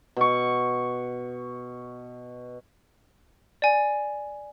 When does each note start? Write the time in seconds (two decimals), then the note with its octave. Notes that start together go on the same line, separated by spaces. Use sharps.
0.16 B2 C#6
3.62 D5 G#5